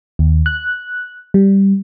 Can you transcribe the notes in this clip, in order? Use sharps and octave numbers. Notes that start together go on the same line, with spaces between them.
D#2
F#6
G3